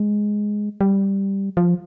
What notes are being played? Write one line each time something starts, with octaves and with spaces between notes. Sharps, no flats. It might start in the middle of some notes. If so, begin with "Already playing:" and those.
Already playing: G#3
G3
F3